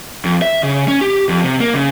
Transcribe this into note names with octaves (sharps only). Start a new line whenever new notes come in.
F2
E5
C#3
C#4
G4
F2
C3
A#3
C#3